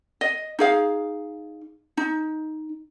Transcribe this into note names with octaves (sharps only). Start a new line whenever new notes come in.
D#5
D#4 G#4 F5
D#4